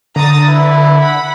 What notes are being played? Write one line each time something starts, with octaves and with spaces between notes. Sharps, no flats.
D3 A#5 D#6 A6
E4 B4
F#5 B5